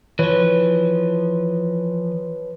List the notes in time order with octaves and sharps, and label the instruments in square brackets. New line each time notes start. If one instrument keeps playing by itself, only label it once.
[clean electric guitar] E3 F3 [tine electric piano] B4 C#5